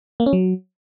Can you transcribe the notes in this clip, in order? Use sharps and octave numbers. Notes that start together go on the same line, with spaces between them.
A#3
C#4
F#3